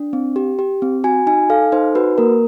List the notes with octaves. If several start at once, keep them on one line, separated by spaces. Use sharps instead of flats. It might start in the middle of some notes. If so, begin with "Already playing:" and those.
Already playing: D4
C4
G4
G4
C4
F#4 G#5
D#4 G#5
A4 F5
D#4 C5
F#4 B4
A#3 A#4